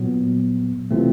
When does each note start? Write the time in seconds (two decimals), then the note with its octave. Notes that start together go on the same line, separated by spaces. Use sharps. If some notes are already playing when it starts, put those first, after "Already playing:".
Already playing: A#2 F#3 B3
0.91 C3 E3 A3 C4 F4